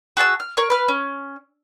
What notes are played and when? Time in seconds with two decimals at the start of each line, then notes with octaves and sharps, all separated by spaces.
0.17 F#4 G#4 A5 E6
0.40 F6
0.57 A#4 C#5 C#6
0.70 B4 F6
0.88 C#4